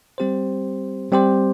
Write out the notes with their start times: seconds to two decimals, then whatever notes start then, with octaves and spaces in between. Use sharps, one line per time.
0.18 G3 C4 G4 C5
1.12 G3 C4 G4 C5